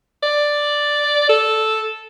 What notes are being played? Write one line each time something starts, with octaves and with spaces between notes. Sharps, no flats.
D5
A4